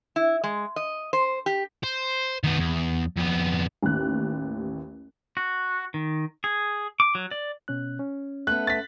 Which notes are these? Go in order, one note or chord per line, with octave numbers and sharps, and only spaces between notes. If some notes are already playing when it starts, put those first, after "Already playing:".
E4
G#3
D#5
C5
G4
C5
D#3 B3
E2
F2 B3
A1 D#2 F#6
F#4
D#3
G#4
D6
F#3
D5
B2 C#4 F#6
C#4
A3 B3 F#6
A6 B6